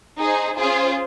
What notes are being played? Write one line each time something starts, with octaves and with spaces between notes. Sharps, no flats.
D#4 G#4 C5
C#4 F4 G#4 C5